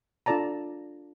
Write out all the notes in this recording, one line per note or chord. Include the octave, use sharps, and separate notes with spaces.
D4 F4 A4 D5 A5 A#5